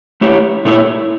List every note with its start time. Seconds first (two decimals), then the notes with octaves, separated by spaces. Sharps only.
0.21 A3 E4 G4 C#5
0.65 A#2 A3 E4 A#4 C#5